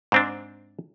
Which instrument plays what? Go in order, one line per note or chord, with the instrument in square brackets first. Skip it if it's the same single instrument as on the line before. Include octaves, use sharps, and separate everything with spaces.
[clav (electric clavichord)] G#2 C4 D4